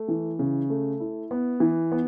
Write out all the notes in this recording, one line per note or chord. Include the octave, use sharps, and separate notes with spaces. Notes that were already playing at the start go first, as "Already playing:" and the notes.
Already playing: A3
E3
C#3
A3
E4
B3
E3
B3